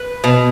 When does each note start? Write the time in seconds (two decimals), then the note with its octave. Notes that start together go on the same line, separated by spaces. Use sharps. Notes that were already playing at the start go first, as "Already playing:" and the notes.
Already playing: B4
0.24 B2